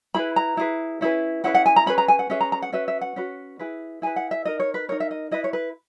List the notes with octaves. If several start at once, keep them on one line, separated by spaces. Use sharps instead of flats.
E4 G#4 B4 B5
A#5
E4 G#4 B4
C#4 E4 G#4 B4
C#4 E4 G#4 B4 F#5
F#5
G#5
A#5
C#4 G#4 B4 B5
A#5
G#5
F#5
C#4 G#4 B4 E5
A#5
A#5
F#5
C#4 F#4 B4 E5
E5
F#5
C#4 F#4 B4
E4 G#4 B4
E4 G#4 B4 G#5
F#5
E5
D#4 A#4 D#5
C#5
B4
D#4 A#4 C#5
E5
D#5
E4 B4 D#5
C#5
B4